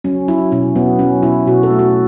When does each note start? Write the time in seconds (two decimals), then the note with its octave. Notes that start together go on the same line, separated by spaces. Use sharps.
0.04 F#3 C#4
0.28 F#3 E4
0.52 B2 C#4
0.76 F#3 B3
0.99 F#3 C#4
1.23 B2 E4
1.47 B2 F#4
1.63 A4
1.70 A3
1.79 F#4